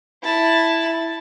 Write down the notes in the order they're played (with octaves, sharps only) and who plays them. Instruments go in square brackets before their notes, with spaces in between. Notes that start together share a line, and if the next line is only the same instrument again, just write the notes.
[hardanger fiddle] E4 A5